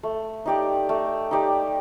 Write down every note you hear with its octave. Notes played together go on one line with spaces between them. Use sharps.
A3
D#4 G4 D5
A3
D#4 G4 D5